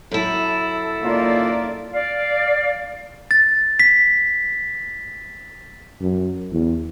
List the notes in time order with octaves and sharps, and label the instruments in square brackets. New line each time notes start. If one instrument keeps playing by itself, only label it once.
[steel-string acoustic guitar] F#2 E4 [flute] A4
[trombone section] C#3 D#4 F4 [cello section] A#3 D5
[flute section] D5 F5
[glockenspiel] A6
B6
[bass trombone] F#2
E2